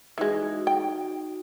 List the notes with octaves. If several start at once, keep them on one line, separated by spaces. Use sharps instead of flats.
E3 G#3 D#4 F#4
G5